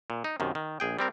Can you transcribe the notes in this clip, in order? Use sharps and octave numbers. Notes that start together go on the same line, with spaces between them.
A#2
D#4
F#2 C3 D#3
D#3
A#1 G#4 G5
G3 C4 A#4